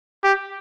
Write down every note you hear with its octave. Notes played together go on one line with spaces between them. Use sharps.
G4